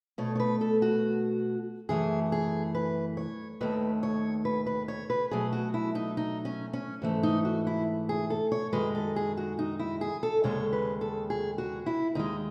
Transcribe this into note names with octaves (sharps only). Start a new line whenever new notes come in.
B2 A3 C#5
C#5
B4
A4
F#4
F#2 E3 A3 G#4
G#4
B4
C#5
D#2 D#3 A3 B4
C#5
B4
B4
C#5
B4
B2 F#3 A3 G#4
F#4
E4
D#4
D#4
C#4
C#4
G#2 E3 A3
D#4
F#4
E4
G#4
A4
C#5
F#2 D#3 G#3 B4
A4
G#4
F#4
D#4
E4
G#4
A4
D#2 C#3 G#3 C#5
B4
A4
G#4
F#4
E4
D#2 D#3 G#3 D#4